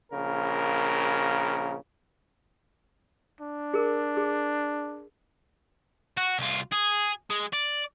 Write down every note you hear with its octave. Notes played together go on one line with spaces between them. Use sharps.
A#1 C#3 A#4
D4
G#4 A#4
G#4
F#4
C2 F4
G#4
G#3
D5